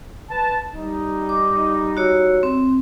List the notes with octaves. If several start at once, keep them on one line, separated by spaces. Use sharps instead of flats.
B4 A5
G3 D#4
D6
F#4 C#5 E6
C4